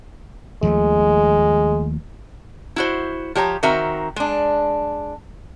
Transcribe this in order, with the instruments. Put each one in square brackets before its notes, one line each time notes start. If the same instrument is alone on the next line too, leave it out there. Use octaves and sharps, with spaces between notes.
[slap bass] D#2 F3 A3 [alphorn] G#3
[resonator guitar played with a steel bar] E4 F#4 C5
F3 G4 C#5 A#5
D#3 C4 F#4 A#4 E5 A#5
G#3 D4